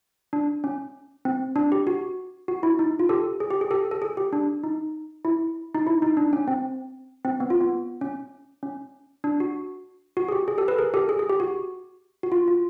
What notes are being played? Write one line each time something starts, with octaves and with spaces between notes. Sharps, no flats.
D4
C#4
C4
D4
G4
F#4
F#4
E4
D#4
F4
G4 A4
G#4
G4
G#4
G4 A4
A4
G#4
G4
D4
D#4
E4
D#4
E4
D#4
D4
C#4
C4
C4
B3
F4
B3
C#4
C#4
D4
F#4
F#4
G#4
G4
G#4
G4 A4
A4 B4
G#4 A#4
G4 A4
G#4
G#4
G4
F#4
F#4
F4
F4